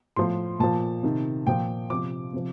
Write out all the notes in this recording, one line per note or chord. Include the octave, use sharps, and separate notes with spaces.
A2 F3 C6
A#2 F3 A5
C3 D#3
A#2 F3 G5
C3 F3 D6
C3 F3